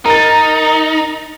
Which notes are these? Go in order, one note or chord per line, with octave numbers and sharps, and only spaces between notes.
D#4 A#4 A6